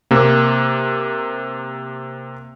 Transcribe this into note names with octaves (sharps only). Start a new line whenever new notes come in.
C3 A#3